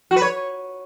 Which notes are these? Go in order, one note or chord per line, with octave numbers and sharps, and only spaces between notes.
F#4
B4
C#5